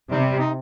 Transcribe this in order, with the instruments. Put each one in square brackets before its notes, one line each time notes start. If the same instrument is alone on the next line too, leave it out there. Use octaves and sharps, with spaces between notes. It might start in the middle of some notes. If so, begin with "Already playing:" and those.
[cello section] C3 [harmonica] D#3 G3
[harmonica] D#4